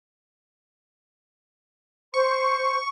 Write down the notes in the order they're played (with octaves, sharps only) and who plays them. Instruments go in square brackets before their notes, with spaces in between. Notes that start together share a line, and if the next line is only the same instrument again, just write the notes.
[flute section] C5 C6 [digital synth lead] C#6